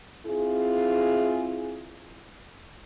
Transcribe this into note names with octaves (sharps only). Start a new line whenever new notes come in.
C4 E4 F4 G#4